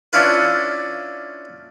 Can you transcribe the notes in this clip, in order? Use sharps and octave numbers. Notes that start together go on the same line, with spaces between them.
C#4 D4 E4 F4 B4